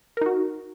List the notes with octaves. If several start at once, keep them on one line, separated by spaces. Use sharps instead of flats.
D#4 F#4 A#4